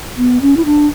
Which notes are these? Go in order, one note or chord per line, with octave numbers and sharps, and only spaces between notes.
B3
C#4
E4
D4